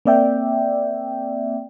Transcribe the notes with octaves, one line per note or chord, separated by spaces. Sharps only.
A#3 C4 D5 E5 G5